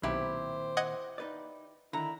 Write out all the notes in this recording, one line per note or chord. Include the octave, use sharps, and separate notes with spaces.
B1 A#2 D#3 C4 E4 G4 C5
D#5 F#5 G#6
D#4 B4 D5
D3 D#3 E4 A#5